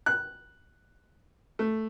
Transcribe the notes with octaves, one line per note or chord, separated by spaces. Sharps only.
F#6
A3